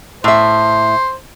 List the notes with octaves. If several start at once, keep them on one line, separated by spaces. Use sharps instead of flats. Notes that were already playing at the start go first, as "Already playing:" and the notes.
A2 C5 E5